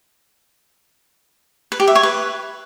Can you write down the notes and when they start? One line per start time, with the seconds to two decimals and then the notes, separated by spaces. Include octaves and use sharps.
1.72 B4
1.80 G4
1.88 E5
1.95 C#5
2.03 B4